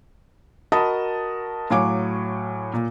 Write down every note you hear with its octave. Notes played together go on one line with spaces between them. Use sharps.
F#4 A#4 D#5 A5 B5 D#6
A2 F#3 F5 G#5 C#6 D6
A#2